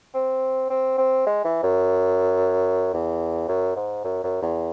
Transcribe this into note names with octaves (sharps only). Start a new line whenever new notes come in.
C4
C4
C4
G#3
E3
F#2
E2
F#2
G#2
F#2
F#2
E2